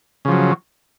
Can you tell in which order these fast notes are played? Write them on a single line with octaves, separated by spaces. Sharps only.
C#3 F3 F#3